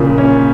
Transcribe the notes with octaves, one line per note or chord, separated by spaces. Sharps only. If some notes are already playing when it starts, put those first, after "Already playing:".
Already playing: A#2 C#3 F3
C#4